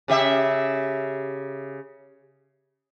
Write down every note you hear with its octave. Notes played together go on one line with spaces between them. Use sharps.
C#3 G4 E5